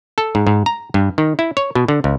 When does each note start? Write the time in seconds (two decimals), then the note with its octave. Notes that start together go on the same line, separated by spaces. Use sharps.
0.18 A4
0.35 G#2
0.47 G#2
0.66 A#5
0.94 G2
1.18 D#3
1.39 E4
1.57 C#5
1.75 B2
1.88 D3
2.04 C#2